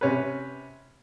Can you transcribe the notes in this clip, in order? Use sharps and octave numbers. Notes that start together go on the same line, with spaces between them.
C3 C#4 B4